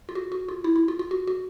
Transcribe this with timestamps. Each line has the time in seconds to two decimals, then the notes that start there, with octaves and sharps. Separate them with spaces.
0.09 F4
0.15 F#4
0.32 F#4
0.48 F4
0.64 E4
0.76 E4
0.88 F4
0.99 F4
1.11 F#4
1.27 F#4